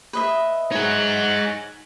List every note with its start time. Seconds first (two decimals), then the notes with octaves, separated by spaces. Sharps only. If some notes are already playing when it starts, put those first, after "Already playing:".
0.13 B4 D#5 E5
0.72 D#4 G#4 C#5 F#5